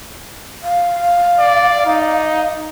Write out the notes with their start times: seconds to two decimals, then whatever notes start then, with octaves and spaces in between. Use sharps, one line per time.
0.63 F5
1.38 D5
1.86 D#4